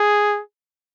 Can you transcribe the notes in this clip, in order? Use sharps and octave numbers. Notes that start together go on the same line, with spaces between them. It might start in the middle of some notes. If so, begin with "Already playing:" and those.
Already playing: G#4